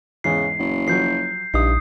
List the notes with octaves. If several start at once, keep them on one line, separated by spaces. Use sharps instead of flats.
E2 G#2 C#3 E3 C7
F#1
F3 F#3 G6 C7
A#1 G2 D#4 E4 D#6 C7